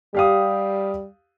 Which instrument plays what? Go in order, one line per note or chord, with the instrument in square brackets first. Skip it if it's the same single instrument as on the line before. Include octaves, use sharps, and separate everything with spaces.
[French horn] G3 [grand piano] G4 F5 D#6